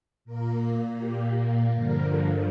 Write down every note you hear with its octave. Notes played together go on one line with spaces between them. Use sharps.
A#2 A#3 A#4
G4
G2 D3 F3 A#4